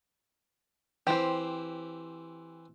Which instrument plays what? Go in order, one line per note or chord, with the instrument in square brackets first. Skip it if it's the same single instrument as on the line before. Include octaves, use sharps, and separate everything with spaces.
[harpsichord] E3 C4 [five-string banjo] G4 C5